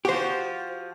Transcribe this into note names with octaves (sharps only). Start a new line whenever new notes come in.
F3 F#4 G4 C5